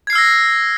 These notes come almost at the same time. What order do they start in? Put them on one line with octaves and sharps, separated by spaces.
G#6 C7 F6 E6 A#6